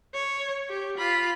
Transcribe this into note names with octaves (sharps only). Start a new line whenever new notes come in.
C#5
G4
F4 B5